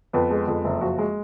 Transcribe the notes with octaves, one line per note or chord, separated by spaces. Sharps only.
F2 B3 B4
G#3
F2
F#1
F3 F#4
G#3